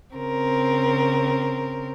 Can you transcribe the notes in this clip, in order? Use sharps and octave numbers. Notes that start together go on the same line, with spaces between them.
C#3 C4 A#4